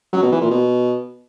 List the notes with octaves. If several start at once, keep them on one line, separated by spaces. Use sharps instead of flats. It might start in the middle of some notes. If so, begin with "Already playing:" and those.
F#3
B2
E3
A#2
B2